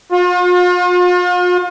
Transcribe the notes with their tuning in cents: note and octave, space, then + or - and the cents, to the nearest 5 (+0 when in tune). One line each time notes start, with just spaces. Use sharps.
F4 +40